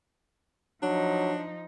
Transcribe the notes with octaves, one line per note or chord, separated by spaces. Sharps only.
F3 F#3 D4 D#4